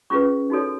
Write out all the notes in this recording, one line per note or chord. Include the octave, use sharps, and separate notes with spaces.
C#4 F4 G#4 B4 C#6
D#4 F#4 A4 C#5